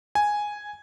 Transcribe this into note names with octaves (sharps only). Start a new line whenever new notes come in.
G#5